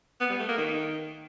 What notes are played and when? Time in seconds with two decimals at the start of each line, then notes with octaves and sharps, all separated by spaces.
0.21 B3
0.30 G3
0.39 A3
0.49 A#3
0.58 D#3